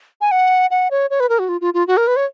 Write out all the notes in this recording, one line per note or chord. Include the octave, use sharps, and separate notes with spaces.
G#5
F#5
F#5
C#5
C#5
B4
A#4
F#4
F4
F4
F4
F#4
A#4
B4
C#5